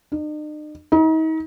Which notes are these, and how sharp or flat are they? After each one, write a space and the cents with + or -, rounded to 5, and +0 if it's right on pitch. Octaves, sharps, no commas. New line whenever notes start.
D#4 -45
D#4 +40